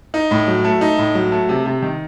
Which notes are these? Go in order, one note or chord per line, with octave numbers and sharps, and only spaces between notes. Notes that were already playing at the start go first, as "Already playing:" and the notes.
D#4
A2
F#3
A3
D#4
A2
F#3
A3
C3
C3
D#3